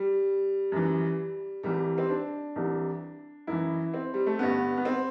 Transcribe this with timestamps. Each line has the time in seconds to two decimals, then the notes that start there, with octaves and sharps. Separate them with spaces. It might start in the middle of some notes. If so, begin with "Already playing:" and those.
Already playing: G3
0.72 F#2 E3
1.63 C2 C3 E3 G3
1.98 C4
2.09 D4
2.56 C2 C3 E3
3.47 F#2 E3 E4
3.94 C4
4.14 G3
4.27 A3
4.39 G2 D3 B3
4.77 B3
4.85 C4